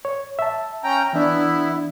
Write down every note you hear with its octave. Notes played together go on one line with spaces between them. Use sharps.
C#5
E5 A5
C#4 G5 A#5
E3 B3 D4 E4